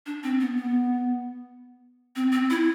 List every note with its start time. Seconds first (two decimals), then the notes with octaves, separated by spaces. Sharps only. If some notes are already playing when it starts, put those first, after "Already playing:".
0.06 D4
0.23 C4
0.40 B3
0.57 B3
2.16 C4
2.32 C4
2.50 E4